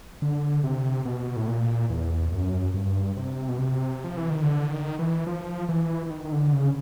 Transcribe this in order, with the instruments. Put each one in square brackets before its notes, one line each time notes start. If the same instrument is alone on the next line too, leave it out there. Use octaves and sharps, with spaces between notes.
[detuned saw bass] D3
C3
B2
A2
A#2
E2
F#2
G2
C3
B2
C3
F3
E3
D#3
D3
D#3
E3
F3
E3
E3
D#3
D#3
D3
C#3